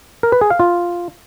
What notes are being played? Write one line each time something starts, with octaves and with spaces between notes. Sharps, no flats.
A#4
B4
G#4
F5
F4